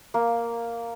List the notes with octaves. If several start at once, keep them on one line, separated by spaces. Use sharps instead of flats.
A#3